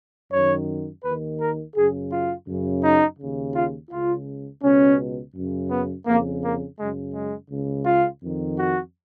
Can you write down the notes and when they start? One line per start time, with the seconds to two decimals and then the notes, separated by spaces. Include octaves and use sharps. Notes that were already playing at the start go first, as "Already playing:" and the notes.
0.32 F#2 D#3 C#5
1.05 D#2 D#3 B4
1.41 A#4
1.76 F#2 C#3 G#4
2.12 F4
2.48 F#2 C#3
2.84 D#4
3.19 D#2 C#3
3.56 F4
3.91 C#2 C#3 F4
4.63 C#2 B2 C#4
5.35 F#2 C#3
5.71 B3
6.07 F2 C#3 A#3
6.43 A#3
6.79 F#2 C#3 G#3
7.14 G#3
7.50 C#2 C#3
7.86 F4
8.22 F2 D#3
8.58 F#4